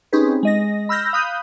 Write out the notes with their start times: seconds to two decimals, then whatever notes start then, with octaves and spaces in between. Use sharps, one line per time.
0.13 C4 C#4 D#4 G4 G#4 B4
0.43 G#3 D#5 A#6
0.89 B5 E6 F6 G6 A#6
1.13 F5 B5 D#6 F#6 G6 D#7